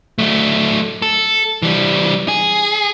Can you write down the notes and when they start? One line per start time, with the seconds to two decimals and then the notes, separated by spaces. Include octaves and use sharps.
0.19 F#3 A3
1.02 A4
1.62 E3 G3
2.28 G#4